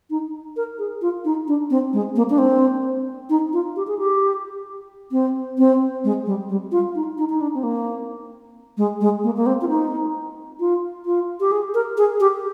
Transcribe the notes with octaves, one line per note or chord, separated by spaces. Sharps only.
D#4
A#4
G#4
F4
D#4
D4
C4
G#3
A#3
D4
C4
D#4
F4
G4
G#4
G4
C4
C4
G#3
G3
G3
F4
D#4
D#4
D#4
D4
C4
A#3
G#3
G#3
A#3
A#3
C4
F4
D#4
F4
F4
G4
G#4
A#4
G#4
G4